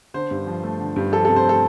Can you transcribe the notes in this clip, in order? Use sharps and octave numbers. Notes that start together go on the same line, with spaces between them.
D3 C5
G2
F3
A3
D3
G2
F3 A4
C3 A4
C5
A3 A4